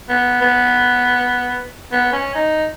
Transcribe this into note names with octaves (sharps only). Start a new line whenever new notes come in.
B3
B3
B3
C#4
D#4